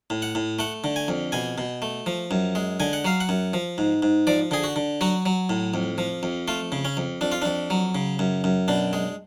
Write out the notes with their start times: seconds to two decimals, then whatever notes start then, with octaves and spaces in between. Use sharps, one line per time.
0.10 A2
0.22 F#5
0.35 A2
0.59 A3 F#5
0.84 D3
0.96 G#5
1.08 F2
1.32 B2 G#5
1.58 B2
1.82 A3
2.06 F3
2.31 F#2
2.55 G#3
2.80 D3 G#5
2.93 F#5
3.05 F#3 F5
3.20 F#5
3.29 F#2
3.54 F3
3.78 G#2
4.03 G#2
4.27 F3 D5
4.51 D3 G#4
4.64 F#4
4.76 D3
5.01 F#3 F#4
5.26 F#3
5.50 A2
5.74 F2
5.98 F3
6.23 F2
6.48 A3 F4
6.72 C#3
6.85 C#4
6.97 F2
7.21 F2 D4
7.32 F4
7.42 F2 D4
7.70 F#3
7.95 C#3
8.19 F#2
8.44 F#2
8.68 B2 D4
8.93 G#3